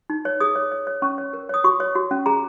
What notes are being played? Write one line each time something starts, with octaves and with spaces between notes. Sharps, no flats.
D#4
C#5
G#4 D#6
C#5
C#5
C#5
C#4 C#6
C#5
A#4
C#5 D#6
F#4 C#6
C#5
F#4
C#4
G#4 A#5